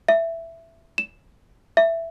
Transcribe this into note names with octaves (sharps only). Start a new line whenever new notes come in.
E5
E7
E5